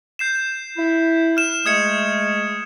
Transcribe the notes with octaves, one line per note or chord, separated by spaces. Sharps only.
G6 C7 E7
E4
F6 E7
G#3 A3 D#6 G#6 C#7